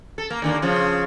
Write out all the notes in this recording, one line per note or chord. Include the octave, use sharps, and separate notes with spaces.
A4
A#3
D#2 D3 A#3
C#3 F3